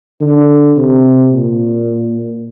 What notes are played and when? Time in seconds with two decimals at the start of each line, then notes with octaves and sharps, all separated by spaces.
0.21 D3
0.77 C3
1.33 A#2